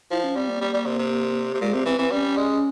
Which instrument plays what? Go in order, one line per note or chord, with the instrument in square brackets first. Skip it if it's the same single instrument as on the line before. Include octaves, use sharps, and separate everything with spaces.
[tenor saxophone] F3 [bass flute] E4
[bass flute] C#4
[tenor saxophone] G3 [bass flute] C4
[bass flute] A#3
[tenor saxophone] G3
G3
C3
C3
C3
[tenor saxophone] A#2 [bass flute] G#3
[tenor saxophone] C3 [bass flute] C4
[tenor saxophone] E3 [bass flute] C4
[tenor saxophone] E3 [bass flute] C4
[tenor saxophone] G3 [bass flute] C#4
[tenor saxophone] G#3